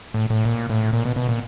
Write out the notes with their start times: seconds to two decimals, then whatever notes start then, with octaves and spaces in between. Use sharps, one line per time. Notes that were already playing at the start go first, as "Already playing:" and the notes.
0.14 A2
0.30 A2
0.45 A#2
0.70 A2
0.93 A#2
1.05 B2
1.16 B2
1.29 A#2